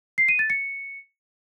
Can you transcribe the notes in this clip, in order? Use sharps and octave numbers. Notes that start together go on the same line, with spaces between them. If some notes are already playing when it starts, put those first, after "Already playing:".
C7
D#7
A6
C#7